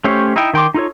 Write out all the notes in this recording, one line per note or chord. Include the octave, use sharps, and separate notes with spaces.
A3 C#4 G4 C5 C#5
D#4 E4 E5 G5
D#3 G5 C6 D6
D#4 F4 A4 C#5